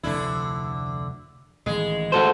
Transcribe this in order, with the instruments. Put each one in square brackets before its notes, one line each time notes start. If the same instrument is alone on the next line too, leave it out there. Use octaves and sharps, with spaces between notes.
[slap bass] F1 D2 [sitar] D3 E4
[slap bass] A1 D#3 [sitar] G#3
[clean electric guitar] F#4 A4 C5